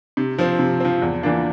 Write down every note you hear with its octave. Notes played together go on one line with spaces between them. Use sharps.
C3
F3 C4
C3
F3 C4
E2
E3 A#3 D4 F4